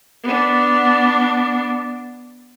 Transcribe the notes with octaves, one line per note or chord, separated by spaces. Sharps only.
B3 D4